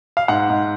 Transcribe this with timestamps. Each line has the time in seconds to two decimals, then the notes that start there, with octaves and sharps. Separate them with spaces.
0.17 F5
0.28 G#2 F#5
0.50 G#2